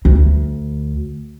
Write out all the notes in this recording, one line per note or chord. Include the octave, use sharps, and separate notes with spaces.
D2